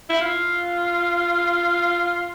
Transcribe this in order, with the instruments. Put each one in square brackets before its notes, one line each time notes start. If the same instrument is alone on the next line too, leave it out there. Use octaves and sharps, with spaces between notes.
[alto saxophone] E4
F4